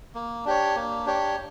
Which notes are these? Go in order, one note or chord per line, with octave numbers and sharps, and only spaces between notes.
A#3
D4 G4 C#5
A#3
D4 G4 C#5